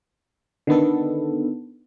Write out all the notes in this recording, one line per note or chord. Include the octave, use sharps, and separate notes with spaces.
D3 D#3 B3 A4